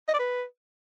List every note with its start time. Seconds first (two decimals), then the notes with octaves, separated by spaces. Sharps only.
0.08 D#5
0.14 D5
0.19 B4